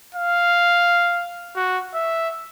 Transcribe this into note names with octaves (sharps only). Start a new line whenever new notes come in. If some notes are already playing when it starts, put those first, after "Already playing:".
F5
F#4
E5